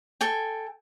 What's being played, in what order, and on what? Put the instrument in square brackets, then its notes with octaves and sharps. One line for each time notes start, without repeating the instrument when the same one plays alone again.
[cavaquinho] A4 G5 G#5